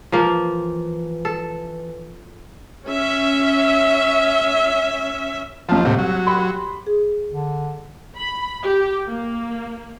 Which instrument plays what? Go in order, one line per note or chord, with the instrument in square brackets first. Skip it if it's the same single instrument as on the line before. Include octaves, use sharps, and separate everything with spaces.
[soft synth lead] E3 [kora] F3 A#3
[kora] A4
[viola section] C#4 E5
[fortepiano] D#2 A5 [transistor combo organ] F3
[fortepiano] C2 [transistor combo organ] A2 C3
[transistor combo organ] F#3
[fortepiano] G4 B5 C6
[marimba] G#4
[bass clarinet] D3
[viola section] B5
G4
A#3